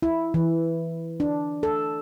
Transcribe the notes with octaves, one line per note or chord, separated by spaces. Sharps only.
E4
E3
D4
A4